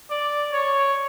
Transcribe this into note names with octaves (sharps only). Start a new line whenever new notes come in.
D5
C#5